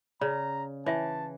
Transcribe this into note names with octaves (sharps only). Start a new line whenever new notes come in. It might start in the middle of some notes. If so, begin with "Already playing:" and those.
C#3 D5 A#5
E3 C#5 E5 G#5 A5